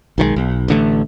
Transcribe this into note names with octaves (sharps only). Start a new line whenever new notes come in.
B1 D#3 E3 G#3
B1
A1 D3 F#3 A3